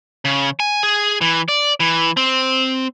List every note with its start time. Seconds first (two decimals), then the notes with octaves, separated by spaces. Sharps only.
0.25 C#3
0.60 G#5
0.83 G#4
1.21 E3
1.49 D5
1.80 E3
2.17 C4